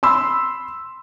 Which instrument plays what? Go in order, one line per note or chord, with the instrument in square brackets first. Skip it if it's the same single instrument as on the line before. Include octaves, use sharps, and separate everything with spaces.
[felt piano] B5 C6 E6